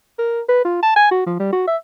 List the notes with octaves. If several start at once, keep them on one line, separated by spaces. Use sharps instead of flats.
A#4
B4
F4
A5
G#5
F#4
F3
G3
F#4
E5